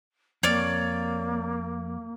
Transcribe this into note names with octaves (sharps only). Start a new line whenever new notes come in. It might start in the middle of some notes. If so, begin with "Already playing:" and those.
F2 A#3 C#5 D5 F6